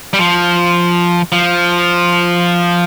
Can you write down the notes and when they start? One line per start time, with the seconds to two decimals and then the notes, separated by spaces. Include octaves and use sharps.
0.13 G3
0.19 F3
1.32 F3